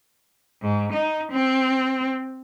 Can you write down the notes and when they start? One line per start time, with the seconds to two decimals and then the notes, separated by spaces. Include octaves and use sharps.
0.62 G#2
0.93 D#4
1.32 C4